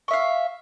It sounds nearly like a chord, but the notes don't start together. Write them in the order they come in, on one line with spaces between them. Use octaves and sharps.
C#6 E5 F5